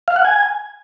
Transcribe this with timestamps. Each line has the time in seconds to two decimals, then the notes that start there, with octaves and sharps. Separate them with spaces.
0.08 F5
0.16 F#5
0.25 G#5